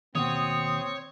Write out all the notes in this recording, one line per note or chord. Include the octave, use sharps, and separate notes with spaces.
D#2 B2 C4 C#5 D#6